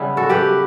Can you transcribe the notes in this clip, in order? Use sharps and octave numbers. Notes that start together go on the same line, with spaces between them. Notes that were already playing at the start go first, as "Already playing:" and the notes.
Already playing: C#3 G3 B3 E4
F#4 A4
G4 B4